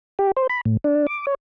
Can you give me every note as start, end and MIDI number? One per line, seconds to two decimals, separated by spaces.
0.19 0.31 67
0.37 0.47 72
0.49 0.61 83
0.65 0.77 45
0.84 1.07 62
1.07 1.25 86
1.27 1.35 73